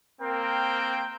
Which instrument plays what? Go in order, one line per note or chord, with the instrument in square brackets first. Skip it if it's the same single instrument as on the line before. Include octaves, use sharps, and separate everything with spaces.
[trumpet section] A#3 C4 A#4 G5